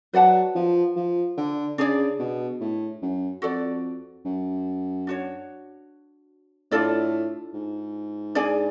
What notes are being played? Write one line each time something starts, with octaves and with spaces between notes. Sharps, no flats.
F#3 B4 D5 F#5 A5
F3
F3
D3
C#3 D4 G#4 D5
B2
A2
F#2
F2 F#4 A4 D5
F#2
D4 F#4 C#5
A2 D4 F4 A4 D5
G#2
D4 G#4 D5 G#5